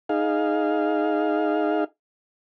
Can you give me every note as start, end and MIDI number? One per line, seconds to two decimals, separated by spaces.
0.09 1.84 63
0.09 1.84 68
0.09 1.84 77